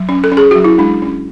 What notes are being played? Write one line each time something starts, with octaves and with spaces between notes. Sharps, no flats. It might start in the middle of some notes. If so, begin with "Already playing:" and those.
Already playing: F#3
C#4
A4
C#4
G#4
F#3 F#4
E4
G#3 D4
C#4